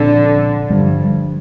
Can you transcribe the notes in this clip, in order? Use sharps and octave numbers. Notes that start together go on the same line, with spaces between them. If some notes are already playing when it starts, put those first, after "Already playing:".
Already playing: A#2 D3 F3 C4
G2 D3 F3 D4